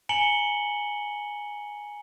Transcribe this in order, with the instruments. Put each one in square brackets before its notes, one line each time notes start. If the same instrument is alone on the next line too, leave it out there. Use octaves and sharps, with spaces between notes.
[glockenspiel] G#5 A#5 C#7 F#7 G7